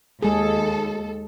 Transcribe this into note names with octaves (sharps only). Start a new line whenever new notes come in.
D#2 G#3 G#4 A4